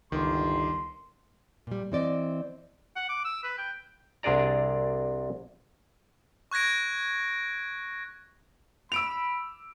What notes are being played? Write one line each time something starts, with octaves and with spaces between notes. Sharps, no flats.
G1 C#2 D#3 C6 D6
A#2 G3
E3 C4 D5 D#5
F#5
D6
E6
B4
G5
C2 C3 D4 G#4 D5 A#5
C#6 F#6 G#6 A#6 D7
B5 E6 D7 F7